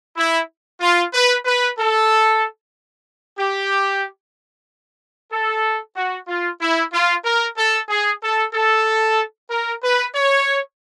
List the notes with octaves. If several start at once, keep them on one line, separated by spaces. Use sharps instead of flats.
E4
F4
B4
B4
A4
G4
A4
F#4
F4
E4
F4
A#4
A4
G#4
A4
A4
A#4
B4
C#5